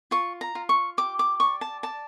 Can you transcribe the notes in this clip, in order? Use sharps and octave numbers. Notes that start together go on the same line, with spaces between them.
F4 C#6
A#5
F4
C#6
G4 D6
D6
D5 C#6
A5
D5 A5